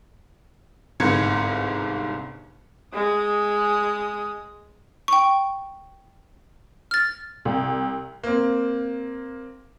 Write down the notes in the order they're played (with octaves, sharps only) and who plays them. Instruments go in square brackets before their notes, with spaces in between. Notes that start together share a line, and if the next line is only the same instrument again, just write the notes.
[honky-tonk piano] G1 C2 G#2 C3 G#6 C#7
[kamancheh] G#3 D#6
[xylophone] G5 C#6
F6 A6
[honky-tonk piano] C2
[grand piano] A#3 C4